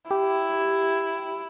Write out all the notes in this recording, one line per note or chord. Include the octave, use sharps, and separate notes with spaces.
E4 G4